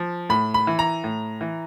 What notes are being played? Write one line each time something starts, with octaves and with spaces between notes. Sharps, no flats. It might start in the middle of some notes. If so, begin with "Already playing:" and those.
Already playing: F3
A2 B5
B5
E3
A#5
A2
E3